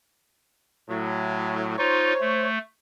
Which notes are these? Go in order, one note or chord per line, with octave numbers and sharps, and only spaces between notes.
A2 F#3
D#4 F4 C5 C#5
A3